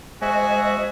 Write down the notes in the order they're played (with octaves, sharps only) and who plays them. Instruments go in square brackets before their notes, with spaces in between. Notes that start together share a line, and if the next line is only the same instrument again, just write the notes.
[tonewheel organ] G#3 C5 D#5 [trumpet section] B3 F#4 [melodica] G#4 E5 G#5